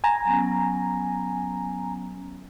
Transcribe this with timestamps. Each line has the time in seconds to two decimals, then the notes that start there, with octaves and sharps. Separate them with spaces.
0.04 G#5 A#5
0.25 F#3 B3 C#4